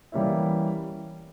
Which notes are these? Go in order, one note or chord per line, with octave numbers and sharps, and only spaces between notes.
E3 G3 A#3 C#4 E4